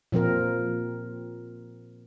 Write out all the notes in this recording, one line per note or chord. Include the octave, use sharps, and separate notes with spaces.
A#2 F3 C4 A#4